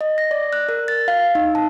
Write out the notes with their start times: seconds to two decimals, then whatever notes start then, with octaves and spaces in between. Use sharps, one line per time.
0.01 D#5
0.18 A#6
0.31 D5
0.53 F#6
0.69 A#4
0.88 A6
1.08 F5
1.35 D#4
1.55 A5